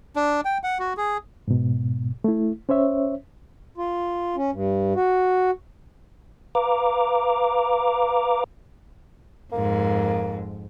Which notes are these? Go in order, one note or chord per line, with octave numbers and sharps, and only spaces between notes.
D4
G5
F#5
F#4
G#4
G#2 B2
A3 E4
C#4 C5 C#5 E5
F4
C#4
G2
F#4
B4 F5 A#5 D6
F2 G#2 A#3